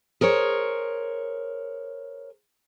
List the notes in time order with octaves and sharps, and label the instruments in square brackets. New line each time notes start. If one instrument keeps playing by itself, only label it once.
[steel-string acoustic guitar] G#4 A#4 C5 C#5